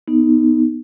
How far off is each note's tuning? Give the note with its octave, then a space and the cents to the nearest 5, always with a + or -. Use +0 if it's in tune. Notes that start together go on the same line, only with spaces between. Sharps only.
B3 +0 D#4 +0